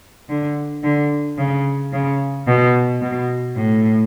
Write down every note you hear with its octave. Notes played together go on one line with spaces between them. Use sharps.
D3
D3
C#3
C#3
B2
B2
A2